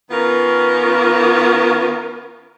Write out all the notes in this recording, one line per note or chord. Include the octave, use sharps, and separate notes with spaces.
D#3 B3 C#4 F4 A#4